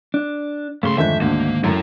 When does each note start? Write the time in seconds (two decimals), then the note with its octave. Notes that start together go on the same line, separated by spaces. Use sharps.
0.14 D4
0.83 B1 C#3 A3 C6
0.98 F2 G#2 D3 D#3 A3 E5 G6
1.22 D2 A3 A#3
1.64 F#2 E4 A4